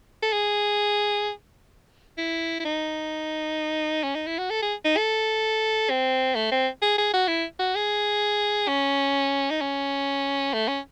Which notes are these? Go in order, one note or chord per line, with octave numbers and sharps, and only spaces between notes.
A4
G#4
E4
E4
D#4
C#4
D#4
E4
F#4
A4
G#4
D#4
A4
C4
A3
C4
G#4
G#4
F#4
E4
F#4
G#4
C#4
D#4
C#4
A3
C#4